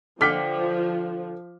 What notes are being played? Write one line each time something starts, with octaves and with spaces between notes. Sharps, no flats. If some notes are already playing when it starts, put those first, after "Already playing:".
D3 F3 G5 D6 F6 B6